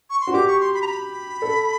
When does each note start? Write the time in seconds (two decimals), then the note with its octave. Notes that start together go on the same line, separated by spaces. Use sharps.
0.10 C#6
0.21 C6
0.27 F#4
0.33 G4 D6
0.47 C#6
0.60 C6
0.74 B5
0.82 A#5
0.87 B5
1.42 A4